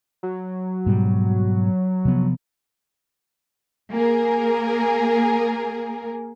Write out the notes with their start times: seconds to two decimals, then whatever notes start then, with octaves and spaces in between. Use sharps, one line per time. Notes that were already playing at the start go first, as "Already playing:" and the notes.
0.23 F#3
0.86 G#2 B2 G3
2.05 C3 F3 B3
3.92 A#3 G#4 A#4